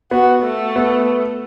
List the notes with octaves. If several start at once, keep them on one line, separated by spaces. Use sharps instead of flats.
B3 F#4
A3
B3